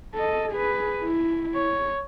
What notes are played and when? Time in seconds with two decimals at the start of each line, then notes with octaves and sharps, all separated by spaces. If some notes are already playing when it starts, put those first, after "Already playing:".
0.15 A4 D#5
0.52 G#4 B4
1.03 E4
1.54 C#5